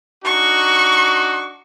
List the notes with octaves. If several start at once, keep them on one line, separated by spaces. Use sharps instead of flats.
D4 D#4 F#4 C#6